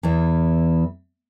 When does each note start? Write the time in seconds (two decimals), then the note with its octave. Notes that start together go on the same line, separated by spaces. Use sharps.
0.03 E2 E3